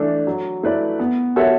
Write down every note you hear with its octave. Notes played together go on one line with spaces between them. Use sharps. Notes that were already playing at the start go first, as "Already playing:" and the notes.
Already playing: E3 A3 D4 A4
F#3
A3 E4 B4 D5
B3
F#4 A4 C#5 E5